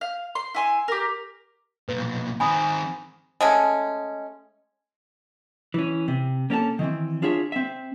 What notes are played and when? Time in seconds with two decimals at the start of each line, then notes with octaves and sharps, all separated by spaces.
0.01 F5
0.35 C6
0.55 E4 G#5 C6
0.88 G4 A#4
1.89 B1 A#2 B4
2.40 D#3 C4 G#5 B5 D#6
3.41 G#3 A3 C#4
5.74 E3 C#4
6.08 C3
6.50 A#3 C#4 A4 A5
6.79 D#3 E3 C4
7.22 D4 F4 G#4 C#5 E5
7.52 C4 E5